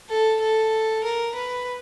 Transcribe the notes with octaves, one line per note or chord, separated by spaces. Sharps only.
A4
A4
A#4
B4